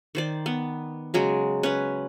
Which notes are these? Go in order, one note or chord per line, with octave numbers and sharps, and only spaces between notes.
D#3 C5 D5
B3
C#3 F#3 G#3
C#4 B4